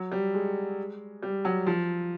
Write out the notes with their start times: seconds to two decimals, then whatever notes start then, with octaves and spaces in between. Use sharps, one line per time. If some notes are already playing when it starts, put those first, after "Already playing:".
Already playing: F#3
0.12 G3
0.34 G#3
1.23 G3
1.45 F#3
1.66 F3